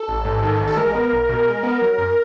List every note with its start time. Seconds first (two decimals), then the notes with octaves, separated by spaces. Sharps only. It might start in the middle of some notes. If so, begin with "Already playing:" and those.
Already playing: A4
0.08 A1
0.25 G#2
0.43 D#3
0.60 A1
0.67 A4
0.77 G#3 A#4
0.95 B3
1.12 B1
1.29 B2
1.47 G#3
1.63 B3
1.82 F#3
1.98 F#2